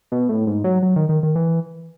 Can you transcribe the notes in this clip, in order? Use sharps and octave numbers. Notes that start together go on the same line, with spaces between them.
B2
A2
G#2
F#3
F#3
D#3
D#3
D#3
E3